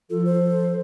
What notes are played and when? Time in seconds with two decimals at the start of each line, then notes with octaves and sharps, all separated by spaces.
0.10 F3 F4 A4
0.25 C5